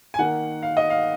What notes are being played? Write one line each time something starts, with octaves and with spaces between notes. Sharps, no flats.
G#5
D#3 A#3 F#5
F5
D#5
F5